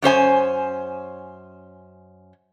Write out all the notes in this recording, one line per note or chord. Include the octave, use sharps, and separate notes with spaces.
F#2 C#4 C5 G#5